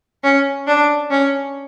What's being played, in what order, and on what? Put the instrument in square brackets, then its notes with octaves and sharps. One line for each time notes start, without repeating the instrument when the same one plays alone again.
[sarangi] C#4
D4
C#4